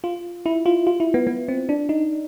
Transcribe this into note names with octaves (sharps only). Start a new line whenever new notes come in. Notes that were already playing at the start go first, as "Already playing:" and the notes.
F4
E4
F4
F4
E4
B3
B3
C4
D4
D#4